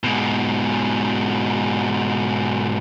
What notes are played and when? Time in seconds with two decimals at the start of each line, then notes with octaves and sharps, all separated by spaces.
0.04 G#2 B2